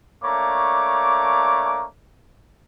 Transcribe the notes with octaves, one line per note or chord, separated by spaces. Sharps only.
A3 A#3 D4 C#5 A#5 D6